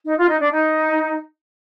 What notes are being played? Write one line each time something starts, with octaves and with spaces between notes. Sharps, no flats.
D#4
F4
D#4
D4
D#4